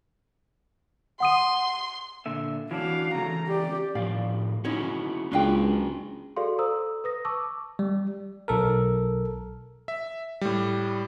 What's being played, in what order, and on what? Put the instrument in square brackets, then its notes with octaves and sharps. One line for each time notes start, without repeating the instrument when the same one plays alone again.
[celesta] F#5 D#6 D#7 [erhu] C6
[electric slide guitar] A#2 D3 E5
[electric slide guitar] E3 C#4 D4 [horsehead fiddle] F#4 F5
[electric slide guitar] C#3 E3 A3 [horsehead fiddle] A#5
[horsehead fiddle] G4 D5
[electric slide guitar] A2 F3 [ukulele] G4 D5 F5
[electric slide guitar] C#4 E4 F#4 [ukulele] D#4 C#5
[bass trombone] C#2 [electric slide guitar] C#4 F#4 G#4 [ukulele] D4 F5 G5
[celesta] F#4 G#4 A4 D5 F5 C6
A4 C5 A#5 D#6 E6
B4 D#6 A#6
A5 C#6 D6 E6
[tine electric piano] G3
B1 A4 A#4
[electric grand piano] E5
A2 G3